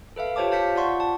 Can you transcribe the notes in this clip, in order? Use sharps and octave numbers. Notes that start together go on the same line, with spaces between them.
A4 B4 E5 F5
F4 G4 C5 C#5 A5 D6
F5 A5 G6 B6 C#7
F4 D5 F#5 C6 C#6
A5